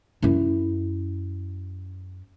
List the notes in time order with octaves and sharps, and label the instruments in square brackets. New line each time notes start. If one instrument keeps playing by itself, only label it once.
[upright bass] F#2 E4